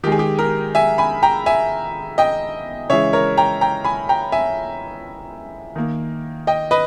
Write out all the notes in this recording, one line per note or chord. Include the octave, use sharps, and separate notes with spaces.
D#3 G#3 G4 G#4
G4
G4 A#4
E5 G#5
G#5 B5
G5 A#5
E5 G#5
D#5 G5
C#3 E3 G#3 C#5 E5
A#4 C#5
G5 A#5
G5 A#5
G#5 B5
G5 A#5
E5 G#5
D#3 A#3
D#5 G5
B4 D#5